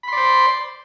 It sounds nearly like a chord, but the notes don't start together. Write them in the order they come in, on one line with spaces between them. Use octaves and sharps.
B5 C6 D5 C5